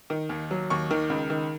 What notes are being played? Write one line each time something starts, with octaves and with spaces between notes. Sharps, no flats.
D#3
D#2
F#3
D#2 C#6
D#3
C#2
D#3